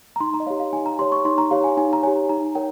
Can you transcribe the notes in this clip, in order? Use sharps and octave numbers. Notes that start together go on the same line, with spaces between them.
A#5
D#4 C6
A#5
D#5
G4 C#5 F5
F5
D#4 G#5
A#5
G4 C#5 C6
C#6
D#4 C6
A#5
G4 C#5 F5
G#5
D#4 G#5
A#5
G4 C#5 G#5
D#4 A#5
A#4 C#5 G5